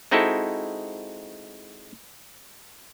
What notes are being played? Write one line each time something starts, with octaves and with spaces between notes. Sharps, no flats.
G#3 C4 D#4 E4 F#4 A4